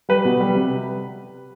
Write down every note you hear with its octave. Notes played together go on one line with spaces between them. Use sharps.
G3 B4
B2
G3
C3